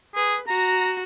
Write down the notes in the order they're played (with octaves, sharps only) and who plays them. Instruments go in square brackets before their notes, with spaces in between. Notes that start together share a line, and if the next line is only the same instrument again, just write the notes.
[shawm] G#4 [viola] B4
[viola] F#4 [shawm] A#5